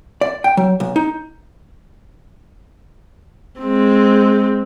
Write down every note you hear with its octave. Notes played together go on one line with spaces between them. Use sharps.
D5
G5
F#3
B1
D#4
G#3 C4